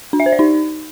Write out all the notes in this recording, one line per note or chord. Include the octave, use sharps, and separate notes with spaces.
D4
E5
C5
D5
D#4